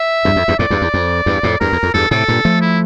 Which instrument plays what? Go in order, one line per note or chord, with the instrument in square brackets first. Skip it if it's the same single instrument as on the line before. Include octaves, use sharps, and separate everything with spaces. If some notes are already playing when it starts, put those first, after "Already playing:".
Already playing: [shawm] E5
[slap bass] E2 G2
F2
E2 G2
[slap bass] F2 A2 [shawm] D5
[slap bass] E2 G2
E2
F2
E2 G2
F2 A2
[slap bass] E2 G2 [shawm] A#4
[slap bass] E2
F2
[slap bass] E2 G2 [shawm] A4
[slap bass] A2 C3 [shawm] A4
[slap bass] G2 A#2
F3 A3
[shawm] E4